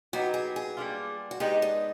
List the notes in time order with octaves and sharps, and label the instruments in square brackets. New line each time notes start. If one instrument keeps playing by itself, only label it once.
[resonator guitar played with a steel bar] F#3 B3 D#4 G4 [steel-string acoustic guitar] F#4
[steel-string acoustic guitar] G#4
G#4
[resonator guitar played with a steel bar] G3 A#3 D4 F4
[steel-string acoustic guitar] F#4
[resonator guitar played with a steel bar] G#3 B3 D#4 G#4 [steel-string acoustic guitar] G4
[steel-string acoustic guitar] D4